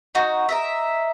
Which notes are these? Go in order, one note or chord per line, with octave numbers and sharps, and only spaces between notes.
D#4 F#4
A#4 D#5 E5